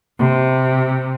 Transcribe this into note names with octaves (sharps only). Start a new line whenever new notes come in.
C3